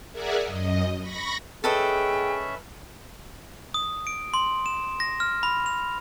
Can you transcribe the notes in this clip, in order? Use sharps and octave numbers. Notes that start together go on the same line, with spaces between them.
G#4 A#4 D5 E5 F#5 G#5
F#2 D#5
B5 C#6 A#6
C#4 G#4 A4 B4 D#5 E5 G5
D#6
D7
C6
E7
A#6
F6
B5
F7